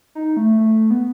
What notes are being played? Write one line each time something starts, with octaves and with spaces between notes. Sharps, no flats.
D#4
A3
A3
B3